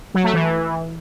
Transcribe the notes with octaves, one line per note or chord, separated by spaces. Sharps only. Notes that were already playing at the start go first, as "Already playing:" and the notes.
F#3
A3
E3